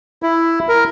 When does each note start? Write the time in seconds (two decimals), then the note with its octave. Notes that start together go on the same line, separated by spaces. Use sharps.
0.23 E4
0.69 A#4